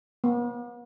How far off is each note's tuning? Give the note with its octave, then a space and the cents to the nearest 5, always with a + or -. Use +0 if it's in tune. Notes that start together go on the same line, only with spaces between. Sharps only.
B3 -45